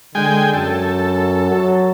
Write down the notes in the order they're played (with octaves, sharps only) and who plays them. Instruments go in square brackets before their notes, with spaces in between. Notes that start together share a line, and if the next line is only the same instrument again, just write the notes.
[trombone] D3 [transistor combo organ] G#3 G5 G#5
[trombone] F#2 [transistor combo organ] A4
[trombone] F#3